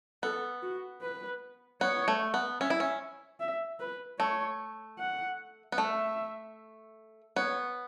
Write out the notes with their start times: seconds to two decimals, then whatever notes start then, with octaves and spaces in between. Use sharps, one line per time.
0.23 B3 A4
0.62 F#4
1.02 B4
1.81 B3 C#5
2.08 A3
2.34 B3
2.61 C#4 E5
2.70 E4
2.80 C#4
3.40 E5
3.80 B4
4.19 A3 C#5
4.99 F#5
5.72 B3
5.78 A3 E5
7.36 B3 C#5